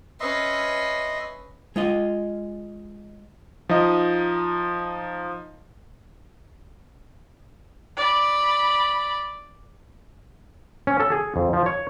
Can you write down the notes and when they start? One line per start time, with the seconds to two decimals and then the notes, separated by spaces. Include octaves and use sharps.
0.20 C#4 B4 D#5 E5 C6
1.76 G#3 F4 D#5
3.69 F3 D#4 D#5
7.97 D5 B5
10.87 C#4
11.00 A4
11.12 G#4
11.36 F2
11.53 F3
11.66 C#5